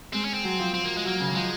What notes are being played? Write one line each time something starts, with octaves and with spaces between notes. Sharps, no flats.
G#3 C4
C#4
C4
F#3
F3
C4
A#3
G#3
F#3 A#3
C#3
D#3
F3 G#3